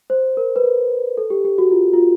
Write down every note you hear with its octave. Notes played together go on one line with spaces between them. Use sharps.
C5
A#4
B4
A#4
A4
G4
G4
F#4
F4
F4